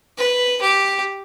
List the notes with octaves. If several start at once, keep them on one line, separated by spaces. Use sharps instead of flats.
B4
G4